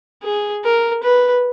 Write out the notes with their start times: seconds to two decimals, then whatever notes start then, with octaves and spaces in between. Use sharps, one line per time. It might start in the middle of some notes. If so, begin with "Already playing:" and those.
0.23 G#4
0.64 A#4
1.03 B4